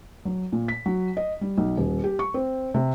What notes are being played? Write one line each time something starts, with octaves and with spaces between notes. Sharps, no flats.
F#3
A#2
B6
F#3
D#5
G3
B1
D#1
G4
C#6
C4
C3